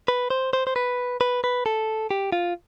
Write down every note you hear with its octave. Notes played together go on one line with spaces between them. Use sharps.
B4
C5
C5
C5
B4
B4
B4
A4
G4
F4